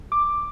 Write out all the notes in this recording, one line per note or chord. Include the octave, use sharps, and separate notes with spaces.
D6